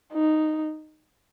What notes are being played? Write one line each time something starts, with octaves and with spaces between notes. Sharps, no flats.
D#4